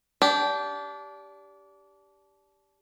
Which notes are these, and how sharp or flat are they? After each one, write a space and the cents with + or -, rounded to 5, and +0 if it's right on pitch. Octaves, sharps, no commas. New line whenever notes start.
D4 -25 G4 +0